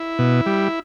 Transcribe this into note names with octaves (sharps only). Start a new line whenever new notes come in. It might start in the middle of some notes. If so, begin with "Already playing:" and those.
Already playing: E4
B2
G3